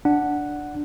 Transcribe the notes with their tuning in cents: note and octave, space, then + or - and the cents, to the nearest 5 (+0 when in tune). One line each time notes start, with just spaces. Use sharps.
D4 +0 F#5 +0